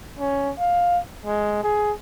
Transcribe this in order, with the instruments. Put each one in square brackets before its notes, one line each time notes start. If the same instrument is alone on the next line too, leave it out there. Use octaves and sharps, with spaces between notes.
[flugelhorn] C#4
F5
G#3
G#4